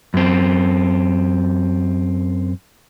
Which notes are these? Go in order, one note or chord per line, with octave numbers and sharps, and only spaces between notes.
F#2 C4